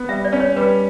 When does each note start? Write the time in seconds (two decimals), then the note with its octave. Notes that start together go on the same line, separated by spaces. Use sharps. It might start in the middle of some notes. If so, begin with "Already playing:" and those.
Already playing: B3
0.08 G3 E5
0.25 D5
0.32 C#4
0.40 C#5
0.56 G3 B4